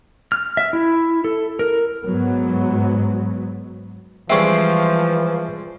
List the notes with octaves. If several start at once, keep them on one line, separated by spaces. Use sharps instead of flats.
F6
E5
E4
A4
A#4
G#2 F#3 B3
E3 F3 G3 G#3 C4 E5 C#6